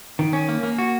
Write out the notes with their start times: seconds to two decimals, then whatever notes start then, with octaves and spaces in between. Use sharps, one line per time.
0.19 D#3
0.33 C#4
0.49 A#3
0.63 A#3
0.78 F#4